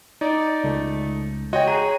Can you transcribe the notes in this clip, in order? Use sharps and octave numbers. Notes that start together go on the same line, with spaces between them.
D#4 D5
C#2 A3
F#4 C#5 D#5 G5
G#4 A#5 D#7